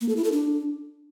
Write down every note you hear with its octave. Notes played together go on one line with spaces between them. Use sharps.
A#3
A4
E4
A4
D4